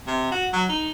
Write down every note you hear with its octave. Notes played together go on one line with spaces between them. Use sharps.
C3
F#4
F#3
D#4